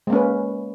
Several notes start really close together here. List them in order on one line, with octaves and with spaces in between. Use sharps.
G#3 A#3 C#4 B4